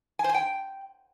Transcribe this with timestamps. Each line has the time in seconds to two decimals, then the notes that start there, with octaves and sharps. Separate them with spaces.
0.19 G#5
0.24 C5
0.29 G#5
0.34 G5